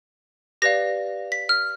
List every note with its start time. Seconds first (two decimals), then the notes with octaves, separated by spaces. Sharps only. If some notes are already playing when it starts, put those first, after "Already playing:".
0.62 G4 B4 D5 F5 A#6
1.32 B6
1.49 F6